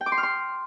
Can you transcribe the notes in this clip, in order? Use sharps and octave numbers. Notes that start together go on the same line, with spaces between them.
G5
D6
C6
F6
C6